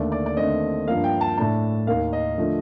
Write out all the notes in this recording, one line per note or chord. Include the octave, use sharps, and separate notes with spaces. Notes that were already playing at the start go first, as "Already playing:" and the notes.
Already playing: D#2 D3 A3 D4 D5
D5
D5
D#2 D3 A3 C4 D#5
G2 F3 A#3 F5
G5
A5
A2 A3 D4 A5
D#2 D#3 A#3 F5
D#5
D3 F3 A3